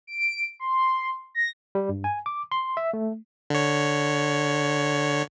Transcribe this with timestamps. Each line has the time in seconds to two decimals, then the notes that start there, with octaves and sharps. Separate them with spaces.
0.07 D7
0.60 C6
1.35 A#6
1.75 G3
1.89 G2
2.04 G#5
2.26 D6
2.52 C6
2.77 E5
2.93 A3
3.50 D3 C#5